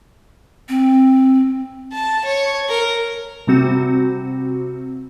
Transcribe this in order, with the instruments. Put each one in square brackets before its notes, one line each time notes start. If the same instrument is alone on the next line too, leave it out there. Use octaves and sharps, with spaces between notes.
[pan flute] C4
[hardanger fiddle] A5
C#5
A#4
[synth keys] C3 G3 C4 F#4